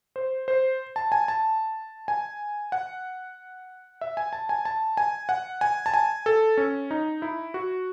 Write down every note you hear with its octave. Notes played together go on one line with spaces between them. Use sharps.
C5
C5
A5
G#5
A5
G#5
F#5
E5
G#5
A5
G#5
A5
G#5
F#5
G#5
A5
G#5
A4
C#4
D#4
E4
F#4